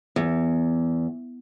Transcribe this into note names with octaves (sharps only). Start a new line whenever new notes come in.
E2